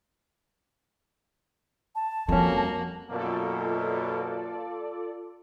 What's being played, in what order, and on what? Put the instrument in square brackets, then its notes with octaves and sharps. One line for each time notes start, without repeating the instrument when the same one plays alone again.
[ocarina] A5
[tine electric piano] F2 C#4 [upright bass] F3 G3 [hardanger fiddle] A#3 F#4
[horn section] F#2 B2 A#3 [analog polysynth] F4 A4 D5